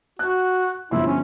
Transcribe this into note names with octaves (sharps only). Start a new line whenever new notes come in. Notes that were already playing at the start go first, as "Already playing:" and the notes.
F#4 F#6
G1 F3 E4 C6
C#4